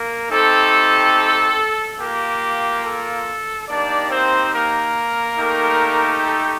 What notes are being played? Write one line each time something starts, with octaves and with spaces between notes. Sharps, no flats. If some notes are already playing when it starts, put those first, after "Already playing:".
Already playing: A#3 A#4
A3 C4 D#4 G4 A4
A#3 F4 G4
A4
A#3 D4 D#4 G4 D5
C4 C5
A#3 A#4
A3 D#4 G4
A4